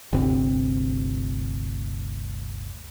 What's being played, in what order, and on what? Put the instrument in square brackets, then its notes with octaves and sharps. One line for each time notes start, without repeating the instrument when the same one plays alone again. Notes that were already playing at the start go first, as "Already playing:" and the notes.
[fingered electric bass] G1 D2 C3 C4